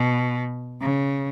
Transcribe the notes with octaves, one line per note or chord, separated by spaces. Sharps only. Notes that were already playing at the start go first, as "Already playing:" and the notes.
Already playing: B2
C#3